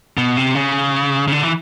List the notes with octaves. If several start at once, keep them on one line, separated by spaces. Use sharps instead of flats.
B2
C3
C#3
C#3
D3
E3